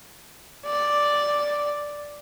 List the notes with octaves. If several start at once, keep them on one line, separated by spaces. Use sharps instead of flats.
D5